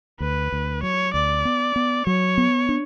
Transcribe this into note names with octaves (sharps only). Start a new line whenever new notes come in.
D2 B4
D2
F#3 C#5
D2 D5
B3
B3
F#3 C#5
B3
D4